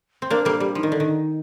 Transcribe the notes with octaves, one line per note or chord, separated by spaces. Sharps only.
C4
A#3 D4 A#4
G3 A#3 A4
G3 G4
F3 D#4
D#3
D3
D#3